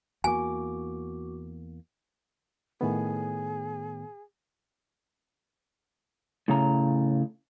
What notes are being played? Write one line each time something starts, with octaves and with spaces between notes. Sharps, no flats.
E2 A#3 F#4 G#5 D6
A2 D#3 B3 G#4
A2 C#3 A#5